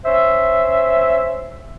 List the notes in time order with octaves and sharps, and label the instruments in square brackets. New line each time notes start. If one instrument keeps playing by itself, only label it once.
[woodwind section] C#4 C5 E5